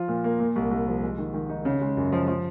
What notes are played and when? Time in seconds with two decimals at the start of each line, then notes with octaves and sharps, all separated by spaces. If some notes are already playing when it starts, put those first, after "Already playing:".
Already playing: F3 F4
0.08 A#2
0.24 A#3
0.39 A#2
0.56 C2
0.71 C2
0.87 F3
1.03 G#3
1.18 D#3
1.34 D#3
1.49 D#4
1.65 C#3
1.81 G#3
1.97 F#2
2.12 F3
2.28 F3